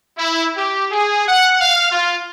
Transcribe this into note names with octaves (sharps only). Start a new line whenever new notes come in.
E4
G4
G#4
F#5
F5
F4